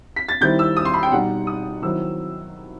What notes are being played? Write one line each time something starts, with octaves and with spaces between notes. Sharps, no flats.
B6
A6
D#3 G3 C4 E4 G6
E6
D#6
C6
B5
G5
B2 G3 D#4 F#5
D#6
D#3 F#3 C4 E4 E6